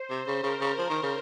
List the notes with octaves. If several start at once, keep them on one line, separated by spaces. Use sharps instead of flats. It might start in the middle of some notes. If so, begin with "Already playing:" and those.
Already playing: C5
C3
C#3
C#3 A#4
C#3
F3
D#3
C#3